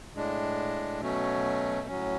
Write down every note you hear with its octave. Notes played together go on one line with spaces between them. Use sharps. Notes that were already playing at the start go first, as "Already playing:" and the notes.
A2 G#3 D4
B2 F#3 A3 C#4
A2 F#3 C#4